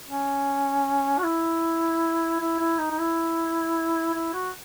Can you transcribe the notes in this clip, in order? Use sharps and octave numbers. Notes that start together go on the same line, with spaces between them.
C#4
F#4
E4
E4
E4
D#4
D#4
E4
E4
F#4